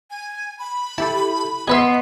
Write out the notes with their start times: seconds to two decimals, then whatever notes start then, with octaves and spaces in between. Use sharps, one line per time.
0.10 G#5
0.59 B5
0.98 E4 G4 A4 A5
1.68 B3 G#4 B4 D#5 E5 C6